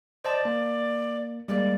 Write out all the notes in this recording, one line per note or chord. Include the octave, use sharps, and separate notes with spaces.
C5 D5 D#5 A5
A#3
G3 G#3 A#3 D5